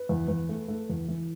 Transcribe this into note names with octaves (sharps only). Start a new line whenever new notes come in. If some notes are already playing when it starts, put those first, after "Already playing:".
Already playing: B4
E2
E2
A3
A3
E2
E3